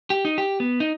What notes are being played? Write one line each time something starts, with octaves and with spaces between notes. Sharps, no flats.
G4
D#4
G4
B3
D#4